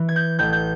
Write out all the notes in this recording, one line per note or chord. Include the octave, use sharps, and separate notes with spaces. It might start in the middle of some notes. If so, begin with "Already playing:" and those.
Already playing: E3
G#6
G6
A1 G6
G6